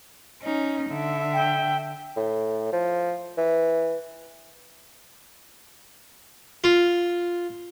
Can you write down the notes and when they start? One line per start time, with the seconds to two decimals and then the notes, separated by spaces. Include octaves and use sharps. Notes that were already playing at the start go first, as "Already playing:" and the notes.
0.42 C#4 D#4
0.90 D3 E5
1.34 G5
2.17 A2
2.72 F3
3.37 E3
6.64 F4